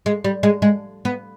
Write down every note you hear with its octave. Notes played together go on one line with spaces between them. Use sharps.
G#3
G3
G#3
G#3
B3